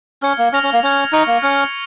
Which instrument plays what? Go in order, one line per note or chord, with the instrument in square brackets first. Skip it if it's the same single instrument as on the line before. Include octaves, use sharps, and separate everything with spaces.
[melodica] C#4 [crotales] F6 G#6 C#7
[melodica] A#3
[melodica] C#4 [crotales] F6 A#6 F7
[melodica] C#4
A#3
[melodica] C#4 [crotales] G#6 F7
[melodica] D#4 [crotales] C#6 F6 C#7
[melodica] A#3
[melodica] C#4 [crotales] F6 G#6 C#7